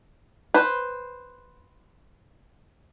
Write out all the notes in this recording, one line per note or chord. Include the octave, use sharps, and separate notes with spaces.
B4 C5